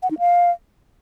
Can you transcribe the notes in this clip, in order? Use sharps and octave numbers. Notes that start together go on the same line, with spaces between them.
F#5
D#4
F5